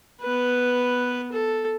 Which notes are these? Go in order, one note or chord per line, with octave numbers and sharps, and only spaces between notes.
B3 B4
A4